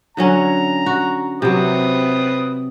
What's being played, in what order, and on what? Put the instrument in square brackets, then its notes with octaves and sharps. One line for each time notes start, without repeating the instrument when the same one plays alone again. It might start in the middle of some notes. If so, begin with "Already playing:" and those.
[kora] D3 F#3 C#4 [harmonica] A#5
[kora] F#4
[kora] C3 F#3 [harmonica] C4 B4 D#6